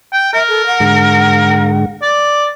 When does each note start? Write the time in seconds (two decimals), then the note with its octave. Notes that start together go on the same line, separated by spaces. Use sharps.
0.13 G5
0.34 A#4 E5
0.48 A4
0.66 F#5
0.80 G#2 D3 G#3
2.03 D5